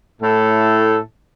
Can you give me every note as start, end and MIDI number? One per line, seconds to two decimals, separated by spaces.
0.22 0.99 45
0.22 0.99 69